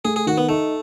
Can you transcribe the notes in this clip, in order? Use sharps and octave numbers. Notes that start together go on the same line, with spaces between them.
A3 G#4
G#4
D#3 F#4
B3
A3 D#4